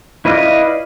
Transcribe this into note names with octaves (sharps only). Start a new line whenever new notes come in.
E4 B4 D5 D#5 F5